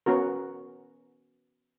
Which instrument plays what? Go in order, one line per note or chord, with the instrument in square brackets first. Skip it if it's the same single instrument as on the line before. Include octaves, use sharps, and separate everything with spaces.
[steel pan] B3 C#4 F#4 A#4